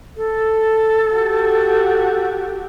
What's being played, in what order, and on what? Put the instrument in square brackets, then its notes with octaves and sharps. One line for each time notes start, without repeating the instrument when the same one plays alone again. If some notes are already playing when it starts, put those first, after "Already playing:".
[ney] A4
[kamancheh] F#4 G4